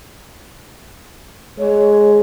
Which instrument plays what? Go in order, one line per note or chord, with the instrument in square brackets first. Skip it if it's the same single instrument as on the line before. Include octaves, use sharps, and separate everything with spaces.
[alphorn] G#3 [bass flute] C#5